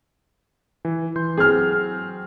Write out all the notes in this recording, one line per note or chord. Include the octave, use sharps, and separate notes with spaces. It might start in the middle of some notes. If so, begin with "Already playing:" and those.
E3
E3 C6 G6
F#3 C4 G#4 F6